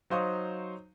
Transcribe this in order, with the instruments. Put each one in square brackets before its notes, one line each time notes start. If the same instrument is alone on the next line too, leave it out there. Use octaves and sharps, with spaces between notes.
[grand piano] F#3 D#4 C5 F5 C#6 D#6